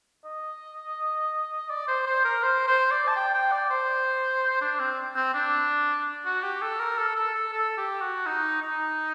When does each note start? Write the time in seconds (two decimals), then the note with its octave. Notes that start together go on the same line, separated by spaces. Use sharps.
0.25 D#5
1.70 D5
1.88 C5
2.07 C5
2.25 A#4
2.43 C5
2.67 C5
2.91 D5
3.08 A5
3.16 G5
3.34 G5
3.52 D5
3.70 C5
4.61 D4
4.80 C4
5.16 C4
5.34 D4
6.26 F#4
6.43 G4
6.62 A4
6.80 A#4
6.98 A4
7.16 A4
7.35 A4
7.53 A4
7.78 G4
8.01 F#4
8.26 D#4
8.62 D#4